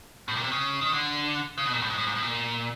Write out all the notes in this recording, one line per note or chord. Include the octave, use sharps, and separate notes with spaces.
A2
A#2
C3
C#3
D#3
D3
C#3
B2
A#2
A2
G#2
A2
G#2
A2
A#2